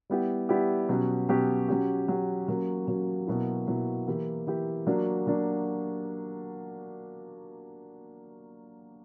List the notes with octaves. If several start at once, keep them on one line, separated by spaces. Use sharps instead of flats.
G3 B3 E4 G4
G3 B3 E4 G4
B2 F#3 C#4 G4
B2 F#3 C#4 G4
F#3 C#4 G4
F#3 C#4 G4
F#3 A#3 C#4 F#4
F#3 A#3 C#4 F#4
B2 F#3 A#3 E4
B2 F#3 A#3 E4
E3 A#3 E4 G4
E3 A#3 E4 G4
F#3 A#3 D4 F#4
F#3 A#3 D4 F#4